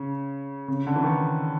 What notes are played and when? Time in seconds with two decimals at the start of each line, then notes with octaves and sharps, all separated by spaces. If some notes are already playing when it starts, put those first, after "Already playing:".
Already playing: C#3
0.68 C#3
0.87 D3
0.96 E3
1.03 D#3